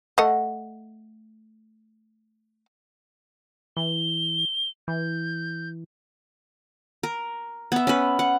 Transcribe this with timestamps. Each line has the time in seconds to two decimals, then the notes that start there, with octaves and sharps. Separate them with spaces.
0.18 A3 D#5 F#5
3.77 E3 G7
4.88 E3 G6
7.03 A#4
7.72 B3 E5
7.87 C#4 B4
8.19 F#5